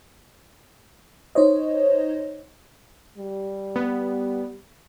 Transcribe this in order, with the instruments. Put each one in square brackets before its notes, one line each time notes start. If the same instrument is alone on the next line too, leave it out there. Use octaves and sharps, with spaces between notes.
[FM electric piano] D#4 C5 C#5 D#5
[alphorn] G3
[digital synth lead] B3